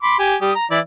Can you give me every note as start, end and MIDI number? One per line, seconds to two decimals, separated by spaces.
0.03 0.16 83
0.03 0.16 84
0.03 0.16 86
0.19 0.35 67
0.19 0.35 80
0.42 0.52 55
0.42 0.52 67
0.42 0.52 87
0.55 0.66 82
0.71 0.79 52
0.71 0.79 64
0.71 0.79 74